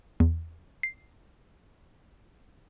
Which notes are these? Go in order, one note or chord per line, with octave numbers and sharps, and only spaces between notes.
E2
C7